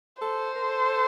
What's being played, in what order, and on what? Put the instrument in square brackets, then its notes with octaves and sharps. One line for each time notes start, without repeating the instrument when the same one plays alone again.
[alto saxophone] A4 [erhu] C5
[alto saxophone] A#4
A4